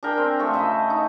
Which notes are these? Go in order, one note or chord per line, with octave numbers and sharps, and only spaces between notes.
D4 G#4 A#4 G5
C4
F3 A3 F4 C#6
C#3 D#5 E5
D#4